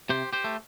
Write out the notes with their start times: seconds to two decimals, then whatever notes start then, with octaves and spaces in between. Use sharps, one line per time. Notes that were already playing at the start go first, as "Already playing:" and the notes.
0.09 C3 G4 C5
0.33 G4 C5
0.44 A3